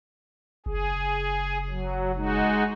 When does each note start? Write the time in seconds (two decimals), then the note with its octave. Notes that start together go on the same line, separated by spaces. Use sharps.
0.66 F#1 G#4
1.70 F#3
2.16 G#3 D#4 F#4